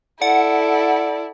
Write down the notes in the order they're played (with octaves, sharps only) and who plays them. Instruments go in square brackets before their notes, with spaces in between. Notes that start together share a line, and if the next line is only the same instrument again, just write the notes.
[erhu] E4 [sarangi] A4 [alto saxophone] D5 [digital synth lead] F#5